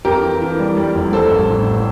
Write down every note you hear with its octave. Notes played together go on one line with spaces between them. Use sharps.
F2 G4 A#4
E3
E3
G3
G3
F1
G3 A4 C5
A1
A2